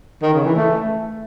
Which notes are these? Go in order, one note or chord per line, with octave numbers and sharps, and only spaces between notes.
D#3
C#3
E3
A3